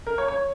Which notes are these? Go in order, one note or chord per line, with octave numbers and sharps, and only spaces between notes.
A#4
C#5
C#5